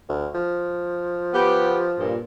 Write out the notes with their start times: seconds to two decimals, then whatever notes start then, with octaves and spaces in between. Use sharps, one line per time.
0.09 D2
0.35 F3
1.34 B3 G4
1.98 G2 A#2